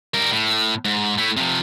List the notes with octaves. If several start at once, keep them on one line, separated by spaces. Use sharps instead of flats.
G3 A#4
A2
G#2
A3 E4
C3 F3